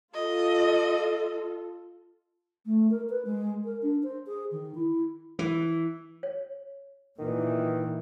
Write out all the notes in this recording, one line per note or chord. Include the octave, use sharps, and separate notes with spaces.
F4 A4 D#5
A3
A#4
B4
G#3
A#4
D4
C5
G#4
D#3
E4
E3
C#5
A#2 D#3 E3